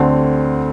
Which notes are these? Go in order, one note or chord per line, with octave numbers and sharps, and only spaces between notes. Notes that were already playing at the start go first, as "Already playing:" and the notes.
Already playing: D2 D3 A3 C4